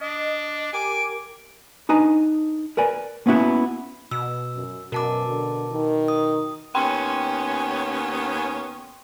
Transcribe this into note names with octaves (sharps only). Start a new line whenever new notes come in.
D4 D#5
G4 A#4 G#5 D6 D7
D4 D#4 B4 G#5 A#5
A#4 B4 D5 G#5
A#3 B3 C#4 E4 F#4
B2 E6
F#2
F#2 B2 A#4 A5 D6
D3
D#3
D#6
D#2 B3 C#4 G5 C6